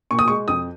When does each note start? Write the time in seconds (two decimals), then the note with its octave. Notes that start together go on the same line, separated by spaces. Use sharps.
0.11 A#2 C#6
0.19 D#6
0.28 G#3 C#6
0.48 F2 D#6